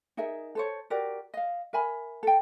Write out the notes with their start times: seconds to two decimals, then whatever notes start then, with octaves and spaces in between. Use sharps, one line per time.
0.17 D#4 G#4 A#4 E5
0.55 A4 C5 C#5
0.90 F#4 G4 A#4 D5
1.34 D#5 F5
1.73 A#4 E5 G#5 B5
2.23 A4 G5